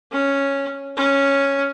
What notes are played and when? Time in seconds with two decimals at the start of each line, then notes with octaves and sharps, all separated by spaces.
0.12 C#4
0.97 C#4